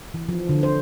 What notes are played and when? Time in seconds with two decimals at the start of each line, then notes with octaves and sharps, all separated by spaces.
0.14 E3
0.29 F3
0.49 D3
0.63 C5